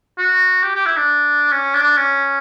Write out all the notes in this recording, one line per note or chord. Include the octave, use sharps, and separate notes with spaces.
F#4
G4
G4
E4
D4
C#4
D4
C#4